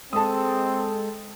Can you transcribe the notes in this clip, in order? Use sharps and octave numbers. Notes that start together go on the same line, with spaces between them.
G#3 C4 A4 A5 D#6